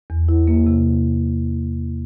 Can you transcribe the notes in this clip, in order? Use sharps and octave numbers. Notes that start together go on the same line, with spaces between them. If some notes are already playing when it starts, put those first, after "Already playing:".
E2
E4
A#3
C3